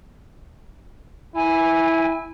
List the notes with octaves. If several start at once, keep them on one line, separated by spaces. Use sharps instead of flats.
E4 G#5